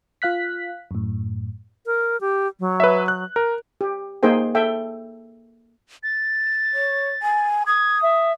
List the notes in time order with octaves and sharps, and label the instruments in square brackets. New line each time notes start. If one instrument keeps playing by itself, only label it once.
[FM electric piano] F4 F5 F#6 B6
F#2 A2
[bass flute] A#4
G4
F#3
[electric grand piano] B4 C#5 E5
F#6
A#4
[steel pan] G4
A#3 D#4 G#4 C5 G5
A4 E5 G5
[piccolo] A6
[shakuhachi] C#5
G#5
[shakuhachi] D#6 [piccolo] G#6
[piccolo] E5